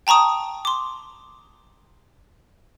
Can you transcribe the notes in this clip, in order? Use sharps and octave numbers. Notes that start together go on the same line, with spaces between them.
G5 A5 A#5 C#6 D#6
C6 D6